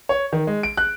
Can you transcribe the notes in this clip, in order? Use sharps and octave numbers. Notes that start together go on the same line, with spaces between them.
C#5
D#3
G#3
D7
F#6